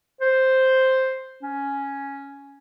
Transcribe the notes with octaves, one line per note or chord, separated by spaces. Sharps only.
C5
C#4